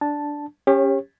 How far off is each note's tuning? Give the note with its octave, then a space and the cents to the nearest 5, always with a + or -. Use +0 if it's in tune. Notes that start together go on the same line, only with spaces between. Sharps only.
D4 +0 A5 +0
C#4 +0 G4 +25 C#5 -30